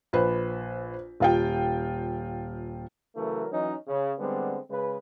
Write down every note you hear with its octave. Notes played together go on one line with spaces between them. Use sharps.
A#1 B4 C5
D#1 F4 G5
C#3 E3 F#3 A3 A#4
E3 F#3 C#4 D#4
C#3
D3 G3 G#3 B3 C4
C#3 G#3 B4